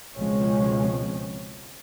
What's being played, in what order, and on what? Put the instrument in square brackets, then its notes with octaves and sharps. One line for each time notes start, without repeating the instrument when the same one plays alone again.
[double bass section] C#2 B2 F3 G#3 C4 C#4